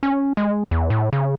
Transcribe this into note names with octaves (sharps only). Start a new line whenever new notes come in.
C#4
G#3
E2
A2
C#3